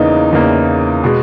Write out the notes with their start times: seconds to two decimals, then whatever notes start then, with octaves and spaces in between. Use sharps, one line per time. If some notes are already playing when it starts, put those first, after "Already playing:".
Already playing: E2 C#3 E3 A#3 D#4
0.33 E2 C#3 E3 A#3
1.04 B2 G#3